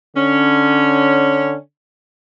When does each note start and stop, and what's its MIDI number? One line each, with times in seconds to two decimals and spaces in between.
0.16 1.57 50
0.16 1.57 61